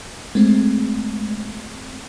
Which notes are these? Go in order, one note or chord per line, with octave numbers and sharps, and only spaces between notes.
G#3 A3 C4